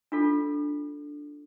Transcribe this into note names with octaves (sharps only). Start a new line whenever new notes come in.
D4 F4 A4